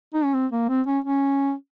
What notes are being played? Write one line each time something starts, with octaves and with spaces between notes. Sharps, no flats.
D#4
C#4
C4
A#3
C4
C#4
C#4